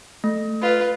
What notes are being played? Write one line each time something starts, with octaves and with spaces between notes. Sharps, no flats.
A3
F4 B4